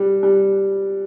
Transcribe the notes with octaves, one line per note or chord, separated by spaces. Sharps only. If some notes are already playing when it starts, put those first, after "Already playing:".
Already playing: G3
G3